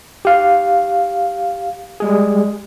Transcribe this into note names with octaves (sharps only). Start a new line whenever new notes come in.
G4 F5
G3 G#3 G#4